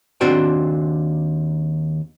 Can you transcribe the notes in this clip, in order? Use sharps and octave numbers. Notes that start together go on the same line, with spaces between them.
D#2 C4 D4 F#4 C5 G5